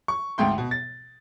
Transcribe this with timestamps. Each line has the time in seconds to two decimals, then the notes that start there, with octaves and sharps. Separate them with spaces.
0.08 C#6
0.38 G#1 D2 G#2 G5 C6
0.58 B2
0.71 A6